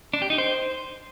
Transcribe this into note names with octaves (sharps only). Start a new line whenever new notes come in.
D4
G4
D#4
C5